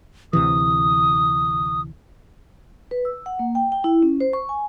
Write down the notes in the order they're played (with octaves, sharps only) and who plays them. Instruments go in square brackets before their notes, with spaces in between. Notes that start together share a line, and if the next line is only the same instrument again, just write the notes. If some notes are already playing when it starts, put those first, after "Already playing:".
[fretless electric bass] D2 C3 E3 [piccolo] D#6
[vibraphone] B4
E6
F#5
A#3
G5
G5
E4
C#4
C5
C#6
G#5